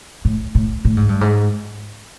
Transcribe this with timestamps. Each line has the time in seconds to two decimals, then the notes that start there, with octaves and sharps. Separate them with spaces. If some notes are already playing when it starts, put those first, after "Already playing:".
0.25 A2
0.55 A2
0.85 A2
0.97 G#2
1.09 G2
1.21 G#2